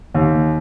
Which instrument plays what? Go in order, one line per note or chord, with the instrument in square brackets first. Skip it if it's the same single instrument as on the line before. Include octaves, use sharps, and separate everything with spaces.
[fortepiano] D#2